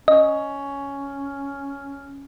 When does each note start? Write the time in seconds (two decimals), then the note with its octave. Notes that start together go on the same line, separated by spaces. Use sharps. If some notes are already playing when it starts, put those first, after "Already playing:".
0.08 C#4 D#5